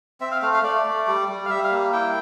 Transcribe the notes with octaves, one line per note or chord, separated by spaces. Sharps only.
C4 E5
F5
A3 F5
F5
A3 D5
A3
G3
G3
F5
G3 E5
F5
A#3
E4 G5